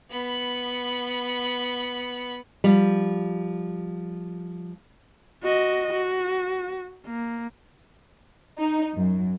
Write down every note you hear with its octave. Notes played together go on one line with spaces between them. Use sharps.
B3 B5
F3 G3
F#4 D#5
F#4
A#3
D#4
F#2